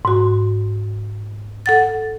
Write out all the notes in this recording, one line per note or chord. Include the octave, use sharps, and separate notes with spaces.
G#2 F#4
A4 F#5 A6